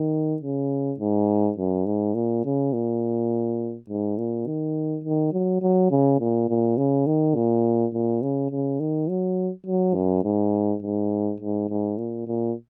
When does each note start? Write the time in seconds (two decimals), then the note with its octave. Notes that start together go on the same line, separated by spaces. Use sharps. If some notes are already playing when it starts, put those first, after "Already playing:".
Already playing: D#3
0.42 C#3
0.99 G#2
1.58 F#2
1.86 G#2
2.15 A#2
2.45 C#3
2.73 A#2
3.89 G#2
4.18 A#2
4.47 D#3
5.04 D#3
5.32 F#3
5.62 F#3
5.91 C#3
6.20 A#2
6.49 A#2
6.77 C#3
7.06 D#3
7.35 A#2
7.93 A#2
8.22 C#3
8.51 C#3
8.80 D#3
9.09 F#3
9.66 F#3
9.95 F#2
10.24 G#2
10.83 G#2
11.40 G#2
11.69 G#2
11.98 A#2
12.27 A#2